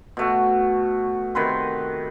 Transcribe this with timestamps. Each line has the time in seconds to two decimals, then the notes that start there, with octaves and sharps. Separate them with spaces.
0.17 B2 A3 F#4
1.35 C3 D#3 B4 C6